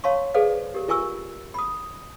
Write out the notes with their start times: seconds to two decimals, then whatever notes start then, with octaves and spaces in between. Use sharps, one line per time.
0.04 C#5 F5 A5 C6 C#6
0.34 G#4 A4 B4 C5 D5 F5
0.74 G4 A#4
0.88 F4 A#4 G#5 C#6 E6
1.54 B5 D#6